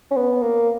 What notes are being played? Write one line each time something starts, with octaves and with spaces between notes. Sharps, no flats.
C#4
B3
A#3